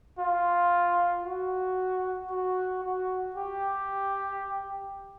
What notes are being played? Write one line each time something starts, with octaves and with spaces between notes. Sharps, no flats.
F4
F#4
F#4
F#4
G4